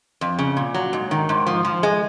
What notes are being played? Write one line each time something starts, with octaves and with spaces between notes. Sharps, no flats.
F2
C#3
A#2
F#3
G#2
D#3
G#2
F3
F3
G#3